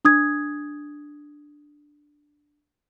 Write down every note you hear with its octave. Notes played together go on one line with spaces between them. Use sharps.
D4 D#6 G#6